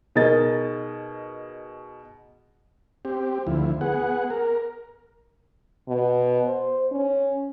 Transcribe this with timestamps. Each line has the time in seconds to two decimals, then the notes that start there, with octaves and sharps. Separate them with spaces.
0.15 B2 D#4 G#4 A#4 D#5 A6
3.05 C4 G4
3.47 D2 F3 E4
3.81 B3 G#4 F#5
4.30 A#4
5.89 B2
6.46 C5
6.92 C#4